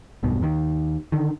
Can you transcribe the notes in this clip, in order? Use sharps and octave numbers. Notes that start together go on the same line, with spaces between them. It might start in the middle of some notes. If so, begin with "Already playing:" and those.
E1 B1 G2 B2
D#2 D#3
D3 D#3